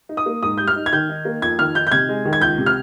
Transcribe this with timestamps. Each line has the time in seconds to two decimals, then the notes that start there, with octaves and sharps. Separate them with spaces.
0.09 D#4
0.17 D#6
0.26 A#3
0.43 G#2 D#6
0.58 G3 G6
0.68 F6
0.76 D#4
0.86 G#6
0.92 D#3 G6
1.09 D#4
1.25 A#3
1.42 F2 G#6
1.59 D#3 F6
1.75 D#4 G6
1.87 G6
1.92 C3 G#6
2.09 G#3
2.25 D#3
2.33 G#6
2.41 C#2 G6
2.58 C3
2.66 F6